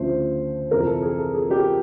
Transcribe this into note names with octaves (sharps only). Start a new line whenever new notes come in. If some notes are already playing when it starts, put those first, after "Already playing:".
Already playing: D2 C#3 F3 A3 C5
F2 C3 E3 A#4
A4
G#4
A4
G#4
G4